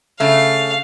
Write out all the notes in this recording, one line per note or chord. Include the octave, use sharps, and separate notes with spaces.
C#3 A3 F5